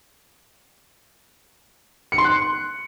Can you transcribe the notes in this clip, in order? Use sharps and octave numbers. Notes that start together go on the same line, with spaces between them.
C#7
C6
F#6